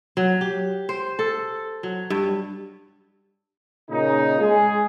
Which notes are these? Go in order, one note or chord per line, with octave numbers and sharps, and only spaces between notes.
F#3
G4
C5
A4
F#3
G2
A#2 C#3 D#4
G#3 G#4